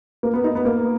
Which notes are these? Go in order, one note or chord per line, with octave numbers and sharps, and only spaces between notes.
A#3
B3
D#4
B3
A#3